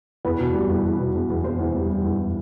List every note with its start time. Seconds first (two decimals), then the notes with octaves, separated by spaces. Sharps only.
0.25 E2 B4
0.39 B2
0.54 G3
0.70 E2
0.85 E2
0.99 B2
1.14 E2
1.30 E2
1.44 E2 C5
1.59 E2
1.74 G3
1.90 G3
2.04 E2